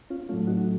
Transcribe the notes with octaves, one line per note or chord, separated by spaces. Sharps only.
C#4 F4
A2 F#3 A3 C#4 F4
D#4 F#4